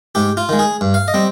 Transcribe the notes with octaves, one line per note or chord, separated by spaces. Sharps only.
G#2 G4
F4
D#3 G#3
G#4
G2
F5
D#5
G3 C4